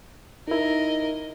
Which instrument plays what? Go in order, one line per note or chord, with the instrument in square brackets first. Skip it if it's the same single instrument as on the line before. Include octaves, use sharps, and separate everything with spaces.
[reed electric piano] D#4 E4 [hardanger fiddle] A#4 D#5